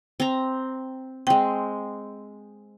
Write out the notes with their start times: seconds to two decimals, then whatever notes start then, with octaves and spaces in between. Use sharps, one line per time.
0.20 C4 A#5
1.27 G#3 C4 G5